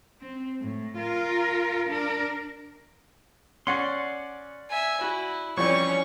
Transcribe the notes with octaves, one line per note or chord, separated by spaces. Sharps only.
C4
A2
F4 A#4
D4 A#4
C#4 D5 F#5 C6
E5 G#5
E4 F#4
F2 E3 G3 C#4 C#5 C#6